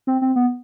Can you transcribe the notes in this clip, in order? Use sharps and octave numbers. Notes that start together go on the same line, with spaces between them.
C4
C4
B3